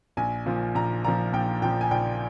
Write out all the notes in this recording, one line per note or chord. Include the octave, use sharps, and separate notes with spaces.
A#1 G#5
A#2 F3
A#1 A#5
A#2 F3 A#5
A#1 G5
A#2 F3 G5
G#5
A#1 G5